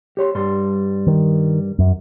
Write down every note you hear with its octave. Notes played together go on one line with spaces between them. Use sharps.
G4 C#5 C6
G2 G3 C6
D#3
F#2